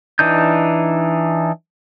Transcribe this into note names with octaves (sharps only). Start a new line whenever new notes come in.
E3 D4 D#4 G6